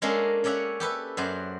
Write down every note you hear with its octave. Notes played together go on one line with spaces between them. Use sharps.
G#3 A#3 C#4 D4 A4 A#4
C#4 C#5 D5 E5 F#5
G4 A4 B4 E5
F#2 F#3 C5 D5